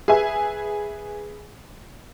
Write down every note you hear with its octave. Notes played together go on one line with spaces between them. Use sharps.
G#4 B4 E5 G#5